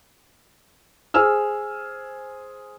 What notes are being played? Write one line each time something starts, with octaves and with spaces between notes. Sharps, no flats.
G#4 C5 G#5 E6 F6